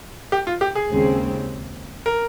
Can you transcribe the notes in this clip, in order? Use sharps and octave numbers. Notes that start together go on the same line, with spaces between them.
G4
F4
G4
G#4
D#2 C#3 G#3 C4
A#4